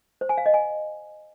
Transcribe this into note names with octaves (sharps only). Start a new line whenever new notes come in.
C5
G#5
F5
D#5
G#5